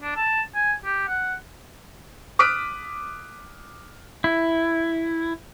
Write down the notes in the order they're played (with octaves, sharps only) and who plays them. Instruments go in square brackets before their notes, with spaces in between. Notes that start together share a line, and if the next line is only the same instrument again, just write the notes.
[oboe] D4
A5
G#5
G4
F#5
[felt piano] D6 D#6 F6 F#6 B6 D7
[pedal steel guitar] E4